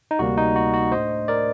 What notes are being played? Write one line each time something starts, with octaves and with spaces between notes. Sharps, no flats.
D#4
D2 C3 G3 A#3 F#4
D#4
F#4
F#4
A2 A3 D4 C5 D#5
A#4 D5